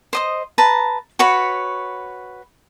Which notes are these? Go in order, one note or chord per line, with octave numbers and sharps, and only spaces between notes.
C5 D#5 D#6
B4 A5 A#5
F#4 B4 C#5 B5